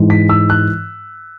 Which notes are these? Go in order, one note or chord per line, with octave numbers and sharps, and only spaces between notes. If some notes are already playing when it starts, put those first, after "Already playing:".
Already playing: G#2 E3 G#3
B6
E6
F#6